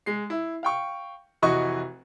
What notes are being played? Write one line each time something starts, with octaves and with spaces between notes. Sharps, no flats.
G#3 C7
E4
F5 G5 C#6
F1 E3 F#4 D#5 C#6